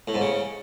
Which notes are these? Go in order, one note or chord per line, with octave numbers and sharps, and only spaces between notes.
A2
G#2
C#3